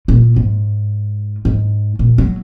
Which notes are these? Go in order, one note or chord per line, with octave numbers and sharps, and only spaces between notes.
A#2
G#2
G#2
A#2
F#3